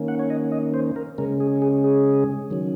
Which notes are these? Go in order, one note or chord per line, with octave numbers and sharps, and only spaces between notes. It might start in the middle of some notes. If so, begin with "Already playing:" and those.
Already playing: D#3 A#3 C#4
F#5
C#5
D#5
D#5
C5
A#4
C#3 G#3 C#4 A#4
G#4
G#4
G#4
D#3 F#3 C#4